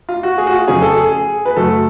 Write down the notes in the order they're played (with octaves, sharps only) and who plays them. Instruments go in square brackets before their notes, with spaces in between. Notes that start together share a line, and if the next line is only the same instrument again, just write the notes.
[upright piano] F4
F#4
G#4
F#4
F4
F2 C#3 F#3 C#4 G#4
A4
G#4
G#4
B4
F#2 C#3 F#3 A3 A4